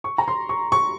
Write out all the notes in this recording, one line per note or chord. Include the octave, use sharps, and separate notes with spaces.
C#6
A#5
C6
C#6
C#6